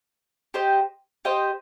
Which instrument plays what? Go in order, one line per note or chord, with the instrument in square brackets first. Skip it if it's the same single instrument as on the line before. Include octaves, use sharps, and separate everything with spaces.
[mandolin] G4 C5 D#5 G5
G4 C5 D#5 G5